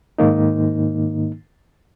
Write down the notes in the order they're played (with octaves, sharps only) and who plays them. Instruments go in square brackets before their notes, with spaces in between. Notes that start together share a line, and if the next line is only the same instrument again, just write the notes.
[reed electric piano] G#2 D#3 A#3 D#4